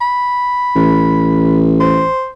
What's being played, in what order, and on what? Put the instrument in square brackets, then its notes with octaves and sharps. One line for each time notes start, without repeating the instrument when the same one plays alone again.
[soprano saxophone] B5
[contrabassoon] A1
[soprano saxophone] C5